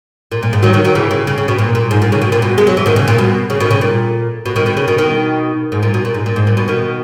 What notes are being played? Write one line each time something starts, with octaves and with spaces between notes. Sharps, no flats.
A#2
A#2
G#2
D#3 F#3
D#3 F#3
D#3 F#3
C#3 E3
C#3
C#3
C#3
B2
A#2
A#2
G#2
A#2
C#3
B2
A#2
B2
G#3
F#3
E3
B2 D#3
C#3
A#2
B2
C#3
B2 D#3
C#3
A#2
B2
B2 D#3
B2 D#3
C#3
B2 D#3
B2 D#3
G#2
A#2
B2
A#2
G#2
A#2
G#2
A#2
B2
B2 D#3